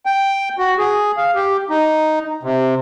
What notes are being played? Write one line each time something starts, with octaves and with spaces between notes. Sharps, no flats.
G5
F#4
G#4
F5
G4
D#4
C3